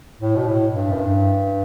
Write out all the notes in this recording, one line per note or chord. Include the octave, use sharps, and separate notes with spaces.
A2
B2
A2
G2
F#2
G2